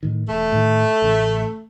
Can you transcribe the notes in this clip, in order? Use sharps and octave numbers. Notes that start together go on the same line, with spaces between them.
A2 D#3
E1 A3
A2 D#3
A1 C#3